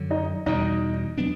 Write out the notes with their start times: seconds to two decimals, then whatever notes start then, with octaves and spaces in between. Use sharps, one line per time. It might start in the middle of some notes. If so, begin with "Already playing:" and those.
Already playing: F#2 D3 F#3
0.10 D#4 D#5
0.46 E2 B2 G3 D#4 D#5
1.18 F#3 B3 D4